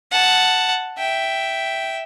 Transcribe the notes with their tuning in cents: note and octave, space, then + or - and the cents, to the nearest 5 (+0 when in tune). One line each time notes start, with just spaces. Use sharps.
F#5 +0 A5 +0
E5 +0 G5 -5